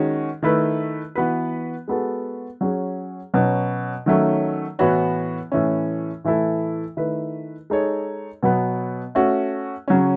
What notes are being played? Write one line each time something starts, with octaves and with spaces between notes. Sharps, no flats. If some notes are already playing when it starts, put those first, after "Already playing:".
Already playing: D#3 G#3 C#4 F#4
D#3 A3 E4 B4
E3 B3 F#4 B4
G#3 B3 F#4 A4
F#3 C#4 G#4
B2 F#3 C#4
D#3 F#3 A3 C#4
A2 E3 B3 F#4 C#5
A2 E3 A3 C#4
A2 E3 A3 E4 A4
D#3 A3 E4 B4
G#3 D#4 A4 C#5
B2 F#3 B3
A3 C#4 F#4
C#3 F#3 C#4